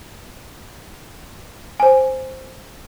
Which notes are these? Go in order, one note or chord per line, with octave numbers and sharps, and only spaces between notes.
C5 G#5